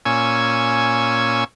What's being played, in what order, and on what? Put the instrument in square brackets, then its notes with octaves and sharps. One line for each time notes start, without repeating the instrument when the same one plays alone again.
[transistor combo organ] A#2 C#4 G#5 C#6 E6